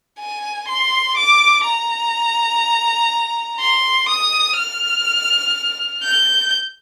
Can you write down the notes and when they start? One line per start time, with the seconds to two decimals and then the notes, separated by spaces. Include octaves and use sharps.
0.19 G#5
0.68 C6
1.17 D6
1.65 A#5
3.60 C6
4.08 D#6
4.57 F6
6.03 G6